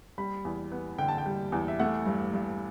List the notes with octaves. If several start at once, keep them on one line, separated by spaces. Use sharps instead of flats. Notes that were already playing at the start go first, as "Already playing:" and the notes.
G3 B5
E2
B3
D3 G5
A5
G5
G3
E2
E5
A3 F#5
G2
G2